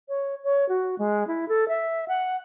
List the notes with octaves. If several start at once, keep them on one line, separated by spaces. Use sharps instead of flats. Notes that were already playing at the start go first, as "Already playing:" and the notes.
C#5
C#5
F#4
G#3
E4
A4
E5
F#5